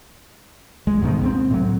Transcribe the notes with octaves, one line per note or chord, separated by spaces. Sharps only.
C#2 G#3
D2 G#2 B2 D#3
C#2 G3 C4
A2 F#3